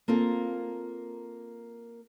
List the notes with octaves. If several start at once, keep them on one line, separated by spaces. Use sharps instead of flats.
A#3 C4 F4 A4